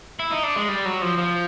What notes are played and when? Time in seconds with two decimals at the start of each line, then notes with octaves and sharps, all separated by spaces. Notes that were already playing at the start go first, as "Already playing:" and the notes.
0.19 E4
0.31 D#4
0.43 D4
0.56 G#3
0.68 G3
0.85 F#3
1.02 F3
1.18 F3